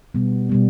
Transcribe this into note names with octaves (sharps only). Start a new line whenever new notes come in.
B2 G3 B3
B2 G3 B3